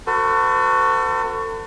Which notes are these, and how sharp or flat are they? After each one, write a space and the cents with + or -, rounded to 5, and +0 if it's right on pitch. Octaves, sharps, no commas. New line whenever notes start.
F#4 +0 A4 +35 C5 -45